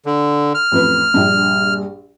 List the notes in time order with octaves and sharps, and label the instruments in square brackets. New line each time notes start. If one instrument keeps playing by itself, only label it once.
[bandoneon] D3
F6
[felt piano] A1 F2 B4
A#1 G2